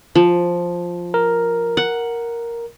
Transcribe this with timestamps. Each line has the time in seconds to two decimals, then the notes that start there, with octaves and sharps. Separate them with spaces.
0.15 F3
1.14 A#4
1.77 F#5